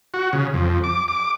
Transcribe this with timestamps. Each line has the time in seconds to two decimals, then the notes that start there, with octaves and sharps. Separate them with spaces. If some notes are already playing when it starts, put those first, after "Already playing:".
0.14 F#4
0.33 C#3
0.54 F2
0.84 D6
1.08 D6